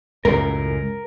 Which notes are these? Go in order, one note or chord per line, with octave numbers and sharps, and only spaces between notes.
C#2 F#2 A2 A#4